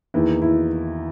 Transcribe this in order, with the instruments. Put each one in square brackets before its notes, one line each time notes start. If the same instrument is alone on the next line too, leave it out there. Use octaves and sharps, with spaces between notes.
[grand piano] E2 D#3 A#3 D#4 [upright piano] E4
[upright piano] E4